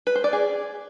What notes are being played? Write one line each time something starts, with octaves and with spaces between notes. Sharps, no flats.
B4
C5
D5
G#4